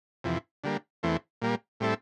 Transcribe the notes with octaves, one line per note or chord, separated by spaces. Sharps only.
F2 C3 E3
D3 G3 A#3
E2 E3 A3 C4
A#2 G3 A#3
A2 G3 C4 E4 A4